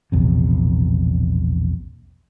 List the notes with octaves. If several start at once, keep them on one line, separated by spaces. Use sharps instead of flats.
E1 A#1 E2 C3